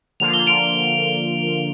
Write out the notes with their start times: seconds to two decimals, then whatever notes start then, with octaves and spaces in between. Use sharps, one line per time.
0.20 D3 F3 A#3 F4 F7
0.34 G7
0.47 D7 F7